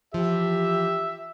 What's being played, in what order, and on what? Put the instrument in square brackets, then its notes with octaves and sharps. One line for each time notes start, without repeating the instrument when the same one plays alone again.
[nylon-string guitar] E3 F3 [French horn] G4 [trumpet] E5